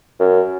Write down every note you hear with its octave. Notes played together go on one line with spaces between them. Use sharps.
F#2